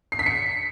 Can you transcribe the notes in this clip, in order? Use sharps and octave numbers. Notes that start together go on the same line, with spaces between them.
C7
B6
C#7